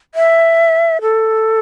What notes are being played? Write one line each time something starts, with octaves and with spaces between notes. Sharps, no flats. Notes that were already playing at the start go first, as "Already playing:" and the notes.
E5
A4